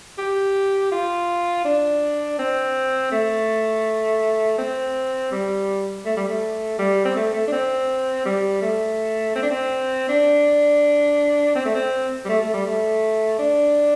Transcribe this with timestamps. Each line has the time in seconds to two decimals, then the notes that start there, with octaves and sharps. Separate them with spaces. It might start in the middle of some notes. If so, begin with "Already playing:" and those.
0.18 G4
0.92 F4
1.65 D4
2.39 C4
3.12 A3
4.58 C4
5.32 G3
6.06 A3
6.17 G3
6.28 A3
6.79 G3
7.05 C4
7.16 A3
7.33 A3
7.47 D4
7.52 C4
8.25 G3
8.62 A3
9.36 C4
9.43 D4
9.50 C4
10.09 D4
11.56 C4
11.65 A3
11.75 C4
12.25 G3
12.29 A3
12.41 A3
12.53 G3
12.66 A3
13.39 D4